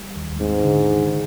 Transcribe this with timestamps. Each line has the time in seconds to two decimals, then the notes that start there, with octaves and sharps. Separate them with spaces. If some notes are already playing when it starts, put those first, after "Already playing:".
Already playing: G3
0.16 D#2
0.40 G#2 C4
0.65 D3
0.90 D#3